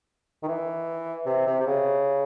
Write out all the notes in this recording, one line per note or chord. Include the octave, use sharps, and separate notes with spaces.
D#3
E3
C3
C3
C3
C#3